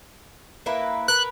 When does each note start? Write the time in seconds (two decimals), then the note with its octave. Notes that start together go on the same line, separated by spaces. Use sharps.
0.66 A#3 E4 B4
1.08 A#4 B4 F#6